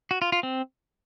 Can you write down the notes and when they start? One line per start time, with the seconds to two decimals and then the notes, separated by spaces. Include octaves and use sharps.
0.11 F#4
0.22 F4
0.32 F4
0.43 C4